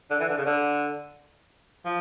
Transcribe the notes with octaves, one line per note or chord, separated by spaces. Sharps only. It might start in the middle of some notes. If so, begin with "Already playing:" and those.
D3
E3
D3
C#3
D3
F3